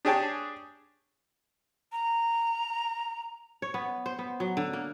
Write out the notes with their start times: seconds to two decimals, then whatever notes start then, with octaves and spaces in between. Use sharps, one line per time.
0.05 D4 G4 G#4 C#5 G5 A5
1.92 A#5
3.62 C#5
3.74 B3
4.06 C5
4.19 B3
4.40 F#3
4.57 D3
4.73 A#3